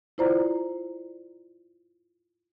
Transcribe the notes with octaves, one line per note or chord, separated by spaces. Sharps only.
E4 F4 C5 D5 A#5